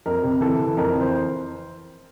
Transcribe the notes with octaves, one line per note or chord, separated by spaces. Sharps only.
F2 A#4
C3
E3 A4
E3
F2 A#4
E3
C5